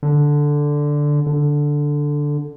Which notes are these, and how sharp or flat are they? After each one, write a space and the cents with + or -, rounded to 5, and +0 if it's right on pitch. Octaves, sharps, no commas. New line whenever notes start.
D3 +0
D3 +0